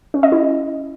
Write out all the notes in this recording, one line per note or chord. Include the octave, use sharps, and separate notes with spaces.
C#4
D#5
E4